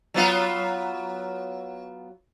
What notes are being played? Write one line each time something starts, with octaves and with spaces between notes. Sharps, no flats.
F#3 B3 F4